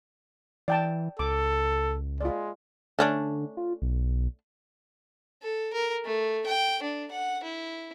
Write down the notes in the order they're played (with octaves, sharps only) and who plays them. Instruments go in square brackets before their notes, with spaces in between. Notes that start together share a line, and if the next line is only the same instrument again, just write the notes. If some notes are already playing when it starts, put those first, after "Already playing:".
[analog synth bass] E3 [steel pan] D5 G5 A5
[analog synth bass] C#2 [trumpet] A4 [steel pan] D6
[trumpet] G#3 [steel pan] F4 D5
[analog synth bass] D3 [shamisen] A3 C#4 D4
[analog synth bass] F4
B1
[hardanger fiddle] A4
A#4
A3
G5
D4
F#5
E4